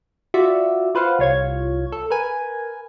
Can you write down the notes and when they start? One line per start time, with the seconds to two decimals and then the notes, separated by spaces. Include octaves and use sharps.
0.34 F4 F#4 D5 E5
0.95 F4 B4 C5 F5 F#5
1.19 C2 F4 C#5 F5 G#6
1.92 A4
2.10 A#4 B4 G#5